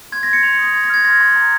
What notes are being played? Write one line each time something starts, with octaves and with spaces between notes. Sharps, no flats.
C6 G#6
C6 A#6
C#7
C6 F7
C#7
D#6 A#6
C6 G#6
A#6
F6 G#6
C6 A#6
C6
A#5